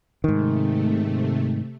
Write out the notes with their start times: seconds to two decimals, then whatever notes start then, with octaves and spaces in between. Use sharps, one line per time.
0.24 G#2 C3 D#3 A3